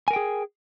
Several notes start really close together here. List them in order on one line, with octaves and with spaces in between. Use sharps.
G#5 A#4 G5 G#4